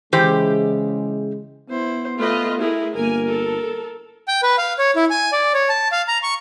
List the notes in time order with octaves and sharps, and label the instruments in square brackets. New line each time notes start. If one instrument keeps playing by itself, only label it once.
[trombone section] C#3 G#3 [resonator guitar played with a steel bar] E3 G4 C5
[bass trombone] B3 [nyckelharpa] E4 C5
[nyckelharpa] A3 [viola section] F4 B4 D#5
[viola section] A3 G#4 A#4 [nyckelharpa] E4
[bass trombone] G1 [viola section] A#3 G#5 [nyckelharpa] A#4
[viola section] A4
[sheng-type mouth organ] G5
B4
F5
C#5
E4
G#5
D5
C#5
A5
F5
A#5
C#6